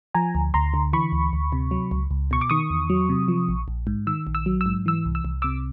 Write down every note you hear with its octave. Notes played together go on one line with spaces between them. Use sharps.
F3 G#5 A#5
D2
D2 A#5 C6
D3
E3 B5 C#6
D2
D2
C3
F#3
C#2
C#2
B2 C#6
D6
D#3 C#6 D#6
E2
F#3
C3
F3
A#1
A#1
G#2
D#3 E6
A#1
E6
F#3
E6
G#2
E3 E6
C2
E6
C2
C3 D6 E6